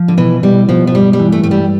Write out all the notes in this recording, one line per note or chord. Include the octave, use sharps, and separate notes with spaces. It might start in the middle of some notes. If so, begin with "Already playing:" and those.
Already playing: F3
D3
B2 E3
B2 G3
B2 F3
F3
G2 G3
G3
E3
A3
G2 A3
G3